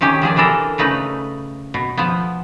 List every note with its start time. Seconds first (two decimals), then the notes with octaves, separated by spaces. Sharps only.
0.01 C3 D#3 C#4 G4
0.22 D#3 F3 G#4 D5
0.36 C3 E3 D4 A4 A#4
0.78 C#3 A3 D#4 B4
1.74 B2
1.97 F3 B3